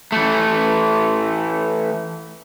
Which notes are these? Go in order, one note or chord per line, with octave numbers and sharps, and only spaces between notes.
E3 A3